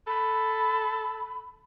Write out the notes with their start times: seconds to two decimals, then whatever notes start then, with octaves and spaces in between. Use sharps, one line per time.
0.07 A4 B5